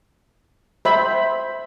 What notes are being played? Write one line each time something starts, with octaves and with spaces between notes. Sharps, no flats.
C5 E5 B5